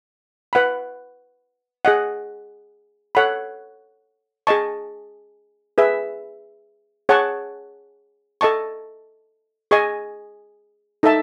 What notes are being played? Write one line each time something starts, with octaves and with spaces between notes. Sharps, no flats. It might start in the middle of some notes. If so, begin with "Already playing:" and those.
B4 F#5 B5
G#4 D#5 F#5
A4 C#5 F#5 B5
G#4 D#5 A5 C#6
G#4 B4 E5
G#4 C#5 F#5 A5 C#6
A4 D#5 A5 C#6
G#4 D#5 G#5 C#6
D#4 A4 E5 A5